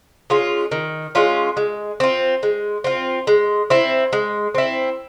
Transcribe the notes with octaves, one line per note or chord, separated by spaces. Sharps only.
G#3 C#4 F4
D#3
G#3 C#4 F4
G#3
C4 F4
G#3
C4 F4
G#3
C4 E4
G#3
C4 E4